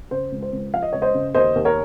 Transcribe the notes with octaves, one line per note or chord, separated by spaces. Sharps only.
C#3 C5
C#2
C5
C#2
F3 F5
D#5
C#2 C#5
C5 D#5
C#3
D#2 C5 D#5
D#2
A#4 C#5